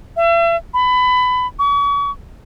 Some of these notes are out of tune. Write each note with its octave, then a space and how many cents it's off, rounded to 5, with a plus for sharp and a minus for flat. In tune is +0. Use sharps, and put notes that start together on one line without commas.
E5 +40
B5 +20
C#6 +40